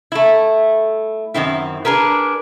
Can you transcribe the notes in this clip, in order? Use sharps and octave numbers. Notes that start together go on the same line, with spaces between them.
A3 E4
F#2 D#3 C4 E4
D4 G#4 A#4 B4